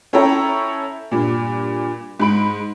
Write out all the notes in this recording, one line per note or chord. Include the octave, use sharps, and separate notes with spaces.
C#4 E4 A4 C#5 G5 A#5
G2 A#2
G#2 B5 D7